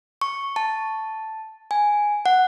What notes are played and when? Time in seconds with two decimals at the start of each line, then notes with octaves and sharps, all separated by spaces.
0.22 C#6
0.56 A5
1.71 G#5
2.26 F#5